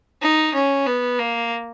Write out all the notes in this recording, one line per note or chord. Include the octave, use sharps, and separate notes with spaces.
D#4
C#4
B3
A#3